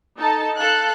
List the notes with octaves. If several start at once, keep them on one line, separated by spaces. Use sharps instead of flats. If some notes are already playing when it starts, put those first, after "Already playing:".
D#4 A4 A5
A4 F5 A5 F#6